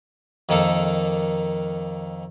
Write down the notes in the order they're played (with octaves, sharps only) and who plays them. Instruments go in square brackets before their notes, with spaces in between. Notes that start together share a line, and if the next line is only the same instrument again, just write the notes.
[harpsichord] F2 D#3 A#3 A4